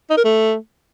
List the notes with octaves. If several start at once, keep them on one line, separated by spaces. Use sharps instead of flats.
D#4
A#4
A3